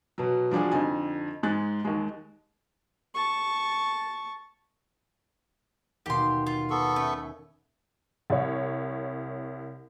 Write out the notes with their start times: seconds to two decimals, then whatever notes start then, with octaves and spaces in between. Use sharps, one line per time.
0.18 B2 F#3
0.51 F3 G3 D4 F#4 G#4
0.72 F2 D3 D#4 G#5
1.43 G#2 G#3 F#6 A6
1.85 D#2 G#3
3.15 A5 C#6
6.06 D#2 B2 G4 C6
6.46 F4
6.70 B3 A4 C#6
6.96 A3 C#4
8.30 C2 C#5